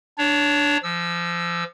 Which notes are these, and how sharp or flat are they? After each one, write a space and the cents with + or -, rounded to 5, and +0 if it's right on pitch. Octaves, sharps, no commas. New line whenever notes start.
D4 +0 C#5 +25
F3 -25 E6 +0